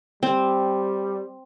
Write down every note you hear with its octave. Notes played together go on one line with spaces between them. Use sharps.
G3 C4